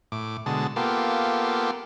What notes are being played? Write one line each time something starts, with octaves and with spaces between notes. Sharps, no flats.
A2 D6
B2 D3 G#3 A5
A#3 B3 F4 G4 A4